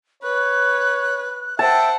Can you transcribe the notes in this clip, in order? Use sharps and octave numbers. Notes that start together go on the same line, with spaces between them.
B4 C#5 F#6
C5 E5 F#5 G5 A5